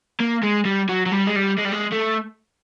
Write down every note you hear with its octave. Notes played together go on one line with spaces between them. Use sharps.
A#3
G#3
G3
F#3
F#3
G3
G#3
G3
G#3
G3
G#3
A3